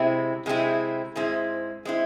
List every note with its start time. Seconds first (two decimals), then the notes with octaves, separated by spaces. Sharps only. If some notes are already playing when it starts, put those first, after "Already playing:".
Already playing: C3 G#3 C4 E4
0.46 C3 G#3 C4 E4
1.16 G#2 G#3 C4 E4
1.85 G#3 C4 E4